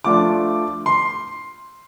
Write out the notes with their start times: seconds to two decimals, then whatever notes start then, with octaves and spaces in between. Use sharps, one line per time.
0.04 F3 A3 D4 F4 D6
0.86 C6